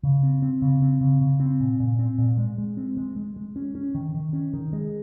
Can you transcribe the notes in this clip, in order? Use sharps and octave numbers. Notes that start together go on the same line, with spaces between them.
C#3
C4
C4
C#3
C4
C#3
C#3
C4
A#2
A#2
C4
A#2
G#3
G#3
C4
G#3
G#3
G#3
C#4
C#4
D#3
D#3
C#4
D#3
G#3